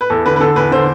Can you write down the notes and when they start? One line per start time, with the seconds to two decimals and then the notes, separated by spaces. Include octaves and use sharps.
0.01 B4
0.10 E2 A4
0.25 D3 B4
0.36 B4
0.40 D3 A4
0.56 E2 B4
0.71 D3 C5